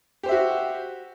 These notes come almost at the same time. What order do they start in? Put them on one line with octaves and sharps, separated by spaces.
G4 C5 E5 F#4